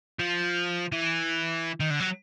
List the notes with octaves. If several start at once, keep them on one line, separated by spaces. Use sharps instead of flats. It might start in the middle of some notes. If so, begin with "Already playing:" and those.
F3
E3
D#3
D3
F#3